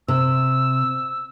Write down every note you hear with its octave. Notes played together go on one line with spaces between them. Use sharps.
C3 E6